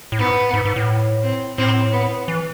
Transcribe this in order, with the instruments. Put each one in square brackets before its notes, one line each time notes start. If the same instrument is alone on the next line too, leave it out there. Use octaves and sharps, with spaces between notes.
[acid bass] A2
[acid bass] G#2 [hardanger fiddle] B3
[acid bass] G#2
G#2
A2
[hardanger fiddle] C4
[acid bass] A2 [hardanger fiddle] C4
[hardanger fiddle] B3
[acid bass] E3